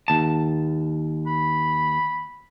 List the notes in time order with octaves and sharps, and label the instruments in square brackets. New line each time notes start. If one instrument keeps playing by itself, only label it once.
[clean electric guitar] D#2 A5
[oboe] B5